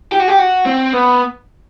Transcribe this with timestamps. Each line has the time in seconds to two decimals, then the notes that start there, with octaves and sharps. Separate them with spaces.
0.12 G4
0.20 F#4
0.28 G4
0.39 F#4
0.66 C4
0.94 B3